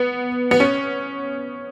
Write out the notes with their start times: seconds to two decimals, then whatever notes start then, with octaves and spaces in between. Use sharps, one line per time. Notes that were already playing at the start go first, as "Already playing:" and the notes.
Already playing: B3
0.51 B3
0.60 C#4